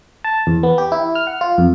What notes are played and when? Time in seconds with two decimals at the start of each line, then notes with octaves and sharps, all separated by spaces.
0.24 A5
0.47 E2
0.63 B3
0.78 G4
0.92 E4
1.15 F6
1.27 F#5
1.41 F4
1.58 F2